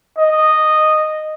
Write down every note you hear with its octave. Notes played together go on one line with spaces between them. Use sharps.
D#5